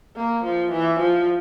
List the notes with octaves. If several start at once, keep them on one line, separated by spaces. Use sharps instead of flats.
A#3
F3
E3
F3